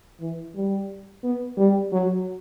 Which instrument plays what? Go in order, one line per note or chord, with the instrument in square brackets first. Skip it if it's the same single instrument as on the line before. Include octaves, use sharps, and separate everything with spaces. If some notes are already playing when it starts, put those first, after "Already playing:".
[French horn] E3
G3
B3
G3
F#3